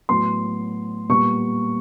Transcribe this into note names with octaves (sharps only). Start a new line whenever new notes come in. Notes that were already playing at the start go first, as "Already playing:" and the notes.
A2 F#3 B3 C6
A#2 G3 B3 C#6